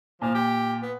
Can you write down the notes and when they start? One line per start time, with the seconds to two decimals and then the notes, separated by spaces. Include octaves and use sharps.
0.22 A#2 F3
0.34 G4
0.82 B3